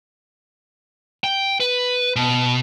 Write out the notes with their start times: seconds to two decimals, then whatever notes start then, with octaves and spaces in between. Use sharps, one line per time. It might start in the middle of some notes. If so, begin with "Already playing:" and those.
1.24 G5
1.60 B4
2.16 B2